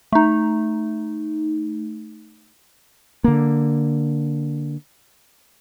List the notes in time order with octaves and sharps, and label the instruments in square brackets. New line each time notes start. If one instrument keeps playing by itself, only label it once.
[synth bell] A3 D#4
[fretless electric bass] D3 A#3